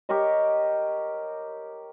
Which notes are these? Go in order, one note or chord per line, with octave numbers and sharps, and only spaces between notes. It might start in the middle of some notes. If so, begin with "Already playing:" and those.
G4 A#4 C#5 D#5